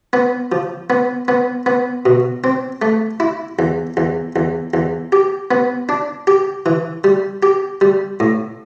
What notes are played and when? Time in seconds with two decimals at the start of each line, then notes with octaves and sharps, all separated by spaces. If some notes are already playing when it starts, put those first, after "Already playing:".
0.13 B3
0.52 F3
0.90 B3
1.28 B3
1.66 B3
2.06 B2
2.44 C4
2.82 A3
3.20 E4
3.59 E2
3.97 E2
4.36 E2
4.74 E2
5.12 G4
5.51 B3
5.89 D4
6.27 G4
6.66 E3
7.04 G3
7.43 G4
7.81 G3
8.20 A2